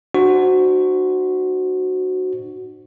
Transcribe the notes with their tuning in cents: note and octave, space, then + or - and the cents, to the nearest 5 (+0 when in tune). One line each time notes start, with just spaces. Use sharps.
D4 +40 F#4 +0 C5 +0